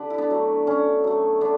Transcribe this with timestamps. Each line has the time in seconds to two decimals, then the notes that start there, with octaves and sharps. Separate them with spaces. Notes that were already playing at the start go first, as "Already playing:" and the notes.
Already playing: D3 G4 B4
0.10 E4
0.18 B3 D4
0.30 F#3 A3
0.67 D3 C#4 E4
1.04 F#3 A3
1.41 D3 B3 D4